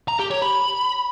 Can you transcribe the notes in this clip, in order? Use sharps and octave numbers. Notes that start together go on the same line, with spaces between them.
A#5
G4
C#5
B5